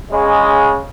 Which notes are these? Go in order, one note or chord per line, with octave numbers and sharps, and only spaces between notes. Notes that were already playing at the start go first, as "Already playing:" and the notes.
C#3 G#3